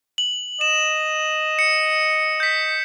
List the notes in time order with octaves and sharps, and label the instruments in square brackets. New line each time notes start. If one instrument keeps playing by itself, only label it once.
[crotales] F#7
[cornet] D#5 [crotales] E7
[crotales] C#7
G6 B6